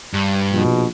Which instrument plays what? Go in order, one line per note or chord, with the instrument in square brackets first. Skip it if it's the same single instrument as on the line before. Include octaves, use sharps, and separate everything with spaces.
[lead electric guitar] G2
[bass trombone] A#1 [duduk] B2